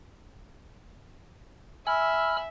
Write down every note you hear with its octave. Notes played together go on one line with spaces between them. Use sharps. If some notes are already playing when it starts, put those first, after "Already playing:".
E5 G#5 B5 E6 F6